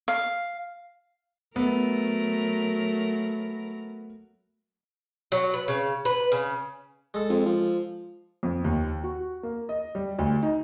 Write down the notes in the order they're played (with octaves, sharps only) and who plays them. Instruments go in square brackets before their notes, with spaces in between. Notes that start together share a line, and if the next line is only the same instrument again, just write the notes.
[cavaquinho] F5
[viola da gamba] F#3 A3 A#4 [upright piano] B3
[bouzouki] F#3
B4
C#3
B4
C#3
[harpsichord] G#3 A4
[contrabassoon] F2
F3
[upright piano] F2
D#2
F#4
A#3
D#5
G3
D2
D#4